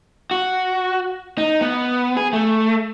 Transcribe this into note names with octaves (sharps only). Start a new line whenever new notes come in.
F#4
D#4
B3
G#4
A3